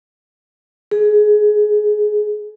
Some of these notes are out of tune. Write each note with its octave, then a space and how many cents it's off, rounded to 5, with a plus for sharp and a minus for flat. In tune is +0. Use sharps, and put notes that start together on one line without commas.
G#4 +20